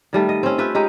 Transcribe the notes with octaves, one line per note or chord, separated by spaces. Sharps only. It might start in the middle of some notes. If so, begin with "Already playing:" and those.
D#3 G3 A3
D#5
C4 C#4
F4 G4 B4 E5
G#3 D#4 G4